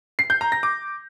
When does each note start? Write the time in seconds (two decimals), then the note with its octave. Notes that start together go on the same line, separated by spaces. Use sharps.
0.19 C7
0.30 G6
0.41 A#5
0.52 A#6
0.63 D6